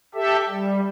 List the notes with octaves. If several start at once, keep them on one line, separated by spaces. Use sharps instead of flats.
G4 A4 E5
G3